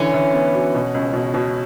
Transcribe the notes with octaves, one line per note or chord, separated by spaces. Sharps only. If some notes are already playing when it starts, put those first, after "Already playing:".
Already playing: D3 E3 C#4
E3
B3
F#4
B2
C#2
B2
B2